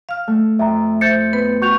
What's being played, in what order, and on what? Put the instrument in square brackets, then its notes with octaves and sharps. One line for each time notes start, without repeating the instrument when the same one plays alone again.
[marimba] F5 F6
[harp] A3
[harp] F2 [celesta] E5 A#5
[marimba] C5 E5 [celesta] G6 A6 C#7
[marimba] B3 B4
[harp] F#4 [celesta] C#6 G6 F7